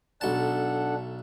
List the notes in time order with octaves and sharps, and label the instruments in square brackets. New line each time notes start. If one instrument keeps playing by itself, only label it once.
[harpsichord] B1 A5 [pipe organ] D4 A4 F#5